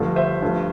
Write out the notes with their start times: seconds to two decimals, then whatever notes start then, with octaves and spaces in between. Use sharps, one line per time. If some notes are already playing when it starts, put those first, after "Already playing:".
Already playing: G2 D3 F3 A3
0.16 C5 E5
0.42 G2 F3 A3